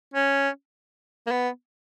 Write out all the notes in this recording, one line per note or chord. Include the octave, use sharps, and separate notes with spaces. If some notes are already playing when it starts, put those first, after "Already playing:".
C#4
A#3
B3